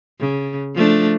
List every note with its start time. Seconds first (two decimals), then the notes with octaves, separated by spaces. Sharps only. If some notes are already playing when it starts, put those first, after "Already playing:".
0.20 C#3
0.75 F3 A3 D4